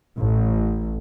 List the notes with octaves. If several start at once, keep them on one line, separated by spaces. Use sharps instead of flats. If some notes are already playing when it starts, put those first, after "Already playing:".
A1